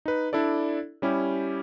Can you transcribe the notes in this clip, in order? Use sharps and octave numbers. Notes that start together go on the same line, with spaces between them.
D#4 B4
D4 E4 A4 D5
G3 C#4 E4 G4